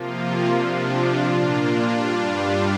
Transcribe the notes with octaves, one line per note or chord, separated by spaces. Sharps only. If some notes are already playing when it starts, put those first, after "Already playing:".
Already playing: C3 F3 A#3 F4
C3 F3 D4 F4
A#2 A#3 D4 F4
G2 G3 D4 F4